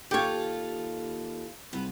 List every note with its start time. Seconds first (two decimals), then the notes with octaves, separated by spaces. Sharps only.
0.11 D#2 F4 G4 A4 C#5
1.73 C2 B3